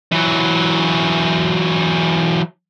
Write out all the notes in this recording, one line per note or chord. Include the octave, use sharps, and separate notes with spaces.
E3 F#3